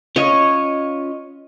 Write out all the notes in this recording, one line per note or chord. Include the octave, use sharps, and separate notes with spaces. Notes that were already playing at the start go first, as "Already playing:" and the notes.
C#4 F4 C#5 D#5